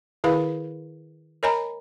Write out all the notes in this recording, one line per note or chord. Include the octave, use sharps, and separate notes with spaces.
D#3 E4 G#4 B4 F5 B5
A#4 C#5 D#5 G#5 A#5 B5